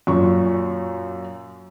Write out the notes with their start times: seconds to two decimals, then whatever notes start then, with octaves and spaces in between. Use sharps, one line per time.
0.07 F#2 A#2 C#6